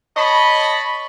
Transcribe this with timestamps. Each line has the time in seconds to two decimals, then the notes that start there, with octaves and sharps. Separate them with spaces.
0.17 C#5 D#5 A5 B5